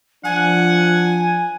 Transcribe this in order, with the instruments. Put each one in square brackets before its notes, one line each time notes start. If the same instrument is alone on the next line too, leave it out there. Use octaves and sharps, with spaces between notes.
[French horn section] F3 [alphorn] D4 [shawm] F#5 [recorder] G#5